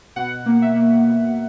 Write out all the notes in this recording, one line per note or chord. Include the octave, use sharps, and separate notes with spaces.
B2 F#5
A#3
E5
A#3
B2